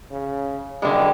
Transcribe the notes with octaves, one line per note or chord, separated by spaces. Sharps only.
C#3
F#1 D3 G3 G#3